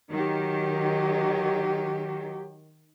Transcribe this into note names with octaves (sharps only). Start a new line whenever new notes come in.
D#3 F#3 G4